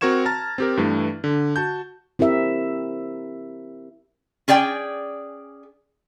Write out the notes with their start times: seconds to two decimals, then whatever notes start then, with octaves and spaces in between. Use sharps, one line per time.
0.01 C4 F#4 A#4 C#6 G#6 E7
0.25 A5 A#5 F6 A6
0.58 C4 G4 A#4
0.77 G2 E3 A3
1.24 D3
1.56 F#4 A5 G6
2.19 C4 E4 G4 A#4 E5
4.48 C#4 G#4 D5 G5